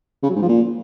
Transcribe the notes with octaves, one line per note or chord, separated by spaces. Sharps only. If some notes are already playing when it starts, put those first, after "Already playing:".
C#3
F#3
G#2
F3
A#2